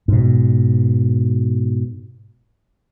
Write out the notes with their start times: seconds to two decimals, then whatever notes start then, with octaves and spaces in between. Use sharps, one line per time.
0.08 G#2 B2